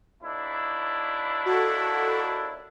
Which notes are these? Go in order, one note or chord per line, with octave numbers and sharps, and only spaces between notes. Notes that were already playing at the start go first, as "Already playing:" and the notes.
D#2 D4 E4
F#4 A4